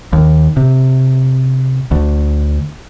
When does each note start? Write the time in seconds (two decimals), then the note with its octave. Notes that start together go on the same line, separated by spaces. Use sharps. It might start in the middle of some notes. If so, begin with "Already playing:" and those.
0.13 D#2
0.57 C3
1.91 D2